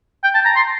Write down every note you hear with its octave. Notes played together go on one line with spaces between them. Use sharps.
G5
A5
A#5
C6